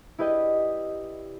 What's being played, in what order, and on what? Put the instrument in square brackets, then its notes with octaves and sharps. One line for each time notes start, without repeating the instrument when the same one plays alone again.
[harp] E4 G4 B4 D5 D#5 G5